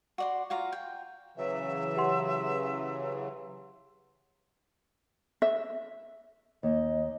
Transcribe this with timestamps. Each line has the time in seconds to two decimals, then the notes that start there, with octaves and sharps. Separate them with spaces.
0.18 F#4 D5 C6
0.50 F4 F#4 F5 A#5
0.72 G5
1.37 C#3 E3 F#3 E5
1.97 G4 F#5 C6
5.42 E5
6.63 D#2 D#5